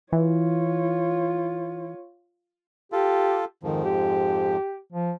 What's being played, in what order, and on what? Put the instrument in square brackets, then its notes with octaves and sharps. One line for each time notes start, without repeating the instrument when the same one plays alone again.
[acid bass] E3 [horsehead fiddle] F4 C#5
[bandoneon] F4 A4 [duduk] G4
[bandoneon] F2 G#2 F3 [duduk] D#3
[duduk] G4
F3